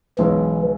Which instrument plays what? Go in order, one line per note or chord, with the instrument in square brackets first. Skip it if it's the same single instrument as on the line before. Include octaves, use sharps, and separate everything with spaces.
[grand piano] B1 B2 G#3 C#4 E4 [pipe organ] E3